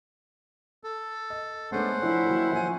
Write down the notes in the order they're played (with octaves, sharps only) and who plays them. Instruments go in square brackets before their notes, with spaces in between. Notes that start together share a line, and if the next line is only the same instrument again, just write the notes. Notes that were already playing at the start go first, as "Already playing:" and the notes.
[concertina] A4
[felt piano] D#5
[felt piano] G#3 A3 B3 [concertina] C#4 C5 F#5 [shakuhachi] D4
[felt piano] F3 A3 D4 [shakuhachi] E4
[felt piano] D#3 F#3 A#3
[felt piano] F3 E5 [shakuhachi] G#5